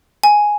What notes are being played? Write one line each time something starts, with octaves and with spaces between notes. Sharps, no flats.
G#5